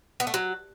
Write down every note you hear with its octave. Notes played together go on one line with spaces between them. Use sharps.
B3
A3
F#3